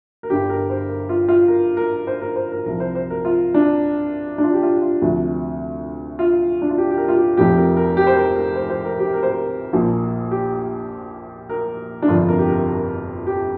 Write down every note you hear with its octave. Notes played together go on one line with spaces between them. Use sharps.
A#4
G1 G2 D3 G4
A#4
C5
A#4
F4
F4
A#4
A#4
C5
A#4
C5
A#4
C2 C3 F3 A#4
C5
C5
A#4
F4
D4
D4
F4
G4
F4
F4
D2 C3 F3
F4
D4
F4
G4
G4
A#4
F4
G4
F1 F2 C3 F3 G4
A#4
A#4
G4
C5
A#4
A#4
C5
C5
A#4
G4
A#4
C5
A#4
A#1 A#2 F3
G4
A#4
D4
G1 F2 C3 F3 F4
A#4
G4
A#4
A#4
G4